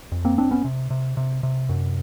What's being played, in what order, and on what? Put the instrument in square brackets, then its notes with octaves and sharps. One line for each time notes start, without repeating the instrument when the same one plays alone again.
[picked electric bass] F2
A#3 C4
F#1 C4 D4
B3 C#4
C3
C3
C3
C3
F#2